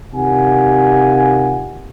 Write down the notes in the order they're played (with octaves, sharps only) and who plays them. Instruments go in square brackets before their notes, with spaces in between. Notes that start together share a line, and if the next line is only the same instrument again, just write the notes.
[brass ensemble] C3 D#3 F4 F#5 G#5